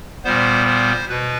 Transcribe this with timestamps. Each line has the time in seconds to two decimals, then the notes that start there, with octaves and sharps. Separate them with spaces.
0.24 A#2 G3 B3 C5
0.66 C5
1.09 B2 B4